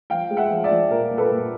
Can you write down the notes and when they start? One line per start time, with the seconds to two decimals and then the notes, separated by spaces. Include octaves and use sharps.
0.10 F3 F5 G5
0.30 G#3
0.37 E5 F#5
0.50 F3
0.64 D5 E5
0.71 F3
0.91 A#2 A#4
1.11 A#2
1.18 A4 B4
1.31 A#2